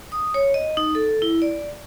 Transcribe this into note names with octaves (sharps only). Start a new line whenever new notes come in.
D#6
C#5
D#5
D#4
A4
E4
D5